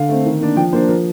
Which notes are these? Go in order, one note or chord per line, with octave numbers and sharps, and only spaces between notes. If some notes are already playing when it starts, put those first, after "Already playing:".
Already playing: D3 F5
A3 C4
D#3
A#3 D4
F3 G5
A#3 D4 C5
F3 A#4